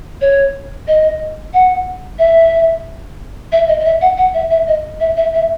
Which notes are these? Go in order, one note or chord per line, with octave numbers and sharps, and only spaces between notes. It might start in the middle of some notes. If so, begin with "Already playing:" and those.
C#5
D#5
F#5
E5
E5
D#5
D#5
E5
F#5
F#5
E5
E5
D#5
E5
E5
E5